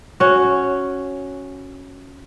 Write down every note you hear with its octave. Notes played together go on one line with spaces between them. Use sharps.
C#4 F#4